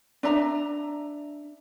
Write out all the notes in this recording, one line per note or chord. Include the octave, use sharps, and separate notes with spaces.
D4 E5 A#5